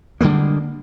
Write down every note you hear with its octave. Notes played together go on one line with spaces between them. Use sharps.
D3 G3 G#3 A#3